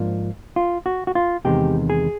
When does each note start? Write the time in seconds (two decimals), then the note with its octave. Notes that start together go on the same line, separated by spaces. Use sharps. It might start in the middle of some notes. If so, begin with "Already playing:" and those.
Already playing: G#2 F3 A#3 D4 F4
0.56 F4
0.86 F#4
1.07 F#4
1.15 F4
1.45 E2 C3 D#3 G#3 G4
1.90 G#4